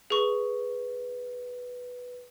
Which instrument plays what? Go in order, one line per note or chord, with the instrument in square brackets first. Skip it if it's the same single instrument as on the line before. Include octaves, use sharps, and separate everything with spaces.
[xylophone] G#4 C#6 [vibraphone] B4